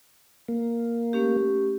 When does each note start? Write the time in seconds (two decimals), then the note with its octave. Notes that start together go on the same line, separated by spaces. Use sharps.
0.48 A#3
1.13 A3 C#4 G4